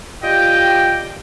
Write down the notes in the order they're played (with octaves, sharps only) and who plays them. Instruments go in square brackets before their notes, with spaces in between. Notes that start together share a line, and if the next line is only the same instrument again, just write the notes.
[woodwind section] F4 G4 D5 D#5 G5